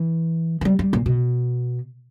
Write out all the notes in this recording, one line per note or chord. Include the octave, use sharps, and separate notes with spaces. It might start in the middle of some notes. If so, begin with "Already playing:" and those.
Already playing: E3
E3
G3
G3
A#2
B2